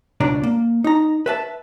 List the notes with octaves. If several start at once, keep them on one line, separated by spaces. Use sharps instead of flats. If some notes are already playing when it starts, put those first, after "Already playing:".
C#2 B2 D4 D5 A#5
A#3
D#4 A#5
B4 E5 A5